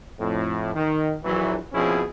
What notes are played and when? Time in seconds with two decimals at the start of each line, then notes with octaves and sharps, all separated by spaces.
0.19 F2 A2
0.75 D#3
1.24 A#1 E3 F#3
1.73 B2 F3 C4 C#4 E4 G#4